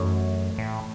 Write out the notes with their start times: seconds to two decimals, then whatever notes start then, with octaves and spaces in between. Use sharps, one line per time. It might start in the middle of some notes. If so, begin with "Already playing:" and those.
Already playing: F#2 E3 A3 D#4 A4 C#5
0.58 A2